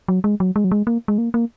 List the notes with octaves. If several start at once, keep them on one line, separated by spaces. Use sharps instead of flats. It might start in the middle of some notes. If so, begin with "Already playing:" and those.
F#3
G#3
F#3
G#3
F#3
G#3
A#3
G#3
A#3
A#3